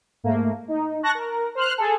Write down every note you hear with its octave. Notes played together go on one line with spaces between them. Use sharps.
G#2 A3 A#3
D#4
A5 C#6 F#6 A#6
A#4
C5 F6 F#6
G#4 A4